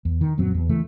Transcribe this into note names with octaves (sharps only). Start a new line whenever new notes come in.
E2
D#3
D#1 F#2 F#3 C4
E2
C#3 E3 A3